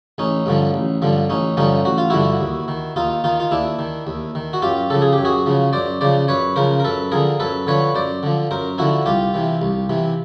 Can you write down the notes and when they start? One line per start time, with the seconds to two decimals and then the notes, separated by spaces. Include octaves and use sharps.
0.18 A1 C#4 D#4
0.46 G2 D3 F3
0.74 A1
1.02 G2 D3 F3
1.30 A1 C#4 D#4
1.57 G2 D3 F3 C#4 D#4
1.85 A1 F#4
1.98 F4
2.10 G2 D3 F3 E4 F#4
2.41 D#2
2.68 D#3
2.96 D#2 D#4 F4
3.24 D#3 D#4 F4
3.40 F4
3.51 D#2 D4 E4
3.79 D#3
4.07 D#2
4.35 D#3
4.53 F#4
4.62 F#2 F4 G4
4.90 C#3 F3 A4
5.02 G#4
5.13 G4
5.18 F#2
5.25 F#4 G#4
5.46 C#3 F3
5.73 F#2 C5 D5
6.01 C#3 F3 C5 D5
6.28 F#2 B4 C#5
6.56 C#3 F3 A#4 C5
6.80 A#4
6.84 F#2 A4 B4
7.12 D3 F3 G#4 A#4
7.40 F#2 A4 B4
7.67 D3 F3 B4 C#5
7.95 F#2 C5 D5
8.23 D3 F3
8.51 F#2 A#4 C5
8.78 D3 F3 E4 F#4
9.06 C2 F4 G4
9.34 C3 E3
9.62 C2
9.90 C3 E3